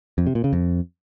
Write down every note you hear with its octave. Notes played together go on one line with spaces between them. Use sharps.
F2
C3
A#2
C#3
F2